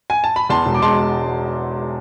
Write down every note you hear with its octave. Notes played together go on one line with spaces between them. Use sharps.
G#5
A5
B5
E2 A5 C6
E1
D6
G#3 A5 C6